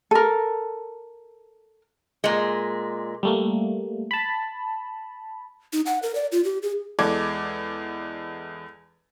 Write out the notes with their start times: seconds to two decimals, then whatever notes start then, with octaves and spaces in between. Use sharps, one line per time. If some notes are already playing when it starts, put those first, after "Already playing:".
0.11 A4 A#4
2.24 A#2 G#3
3.23 G3 A3 A#3
4.11 A5 B5
5.73 D#4
5.86 F#5
6.03 A#4
6.15 D5
6.32 F4
6.44 G4
6.62 G#4
6.99 E2 G#3 A4 D5 D6 G#6